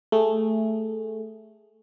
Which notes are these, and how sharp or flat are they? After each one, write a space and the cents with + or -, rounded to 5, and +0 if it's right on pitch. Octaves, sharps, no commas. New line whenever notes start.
A3 +0 G#4 -5